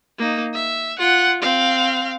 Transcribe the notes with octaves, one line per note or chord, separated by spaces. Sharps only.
A#3 D#4
E5
F4 F#5
C4 F5